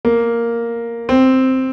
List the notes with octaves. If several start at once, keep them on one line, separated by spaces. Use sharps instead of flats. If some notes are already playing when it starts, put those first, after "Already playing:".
A#3
C4